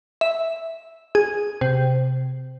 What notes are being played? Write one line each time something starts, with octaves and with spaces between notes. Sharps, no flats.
E5
G#4
C3